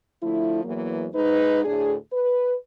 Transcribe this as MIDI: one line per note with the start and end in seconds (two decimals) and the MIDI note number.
0.22 0.63 50
0.22 0.63 53
0.22 0.63 57
0.22 0.63 64
0.63 1.06 40
0.63 1.06 52
0.63 1.06 54
0.63 1.06 58
1.14 1.64 44
1.14 1.64 63
1.14 1.64 71
1.65 1.94 38
1.65 1.94 45
1.65 1.94 62
1.65 1.94 68
2.11 2.54 71